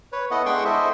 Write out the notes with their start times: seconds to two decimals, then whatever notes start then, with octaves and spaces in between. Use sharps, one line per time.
0.12 B4 C#5
0.31 B3 E4 A4 D#5 F#5
0.46 G#3 D4 F#5 G5 C6 C#6
0.65 E4 A4 C5 D#5 E5